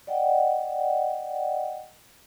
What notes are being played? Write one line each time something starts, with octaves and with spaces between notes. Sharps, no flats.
D5 D#5 F#5 G5